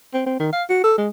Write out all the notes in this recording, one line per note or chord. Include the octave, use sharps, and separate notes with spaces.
C4
C4
D#3
F5
F#4
A4
G#3